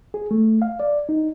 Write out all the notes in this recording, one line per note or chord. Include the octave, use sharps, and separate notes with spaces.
G#4
A3
F5
D5
D#4